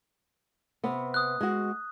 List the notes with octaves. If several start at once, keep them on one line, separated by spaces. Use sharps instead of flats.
C3 B3
D#6 F#6
G#3 F#4